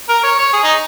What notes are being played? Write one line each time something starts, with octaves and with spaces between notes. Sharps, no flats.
A#4
C#5
C#5
G#4
D#4